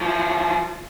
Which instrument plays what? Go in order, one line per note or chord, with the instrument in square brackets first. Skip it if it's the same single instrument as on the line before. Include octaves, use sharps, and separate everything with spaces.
[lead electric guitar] E3 F3